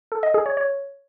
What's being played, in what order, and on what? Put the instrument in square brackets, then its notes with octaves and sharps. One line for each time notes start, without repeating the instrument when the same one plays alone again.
[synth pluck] A4
D#5
G#4
C#5
C#5